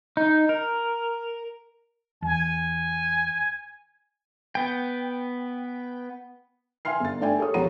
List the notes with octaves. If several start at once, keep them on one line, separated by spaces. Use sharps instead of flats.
D#4
A#4
E2 G#5
B3 G5
E5 G#5 C6 F6 C7
G1 A6
A3 D4 D5 E5 G5 G#5
G4 A4 C#5 D#6
E1 F3 C#5 F#5 A#5 D#7